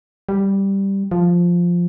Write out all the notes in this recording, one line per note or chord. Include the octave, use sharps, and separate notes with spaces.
G3
F3